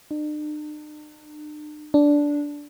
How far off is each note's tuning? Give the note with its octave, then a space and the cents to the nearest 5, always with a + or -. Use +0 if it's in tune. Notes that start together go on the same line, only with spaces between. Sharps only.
D4 +45
D4 -10